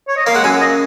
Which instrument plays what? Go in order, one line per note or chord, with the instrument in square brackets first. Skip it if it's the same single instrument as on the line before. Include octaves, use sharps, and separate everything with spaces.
[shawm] C#5
D#5
[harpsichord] A#3 [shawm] F5
[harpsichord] G#3 [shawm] F#5
[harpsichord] F#2 F#3 [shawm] G#5
[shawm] D#5